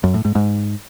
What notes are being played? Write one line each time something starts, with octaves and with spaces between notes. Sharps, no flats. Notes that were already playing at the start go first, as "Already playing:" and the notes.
F#2
A2
G#2
G#2